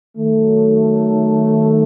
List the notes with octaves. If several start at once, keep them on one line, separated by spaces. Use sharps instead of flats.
D#3 F#3 A3